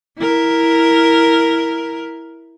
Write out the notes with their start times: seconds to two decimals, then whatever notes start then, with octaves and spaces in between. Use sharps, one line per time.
0.19 E4 A#4